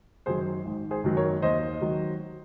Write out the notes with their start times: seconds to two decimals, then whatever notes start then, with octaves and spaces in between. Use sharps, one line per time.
0.26 F#2 D#3 F#3 G#4 C5
0.65 G#1
0.91 G#4 C5
1.04 F#2 D#3 F#3
1.17 A#4 C#5
1.42 D#2 C5 D#5
1.81 D#3 F#3